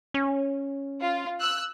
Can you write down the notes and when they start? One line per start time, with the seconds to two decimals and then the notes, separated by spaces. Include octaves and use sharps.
0.14 C#4
1.00 F4
1.39 E6 F#6